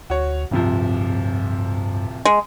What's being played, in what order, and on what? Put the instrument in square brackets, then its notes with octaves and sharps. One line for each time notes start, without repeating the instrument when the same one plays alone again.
[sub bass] D2 [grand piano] F#4 C#5
[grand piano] D1 C3 F3 [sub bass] G2
[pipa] G#3